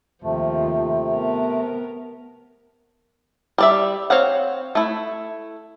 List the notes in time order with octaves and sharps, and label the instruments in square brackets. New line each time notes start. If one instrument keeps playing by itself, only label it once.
[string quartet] D#2 F3 [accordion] C3 A3
[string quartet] B3 A#4
[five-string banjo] G3 D5 E5
C4 C#5 F5 F#5
A3 E4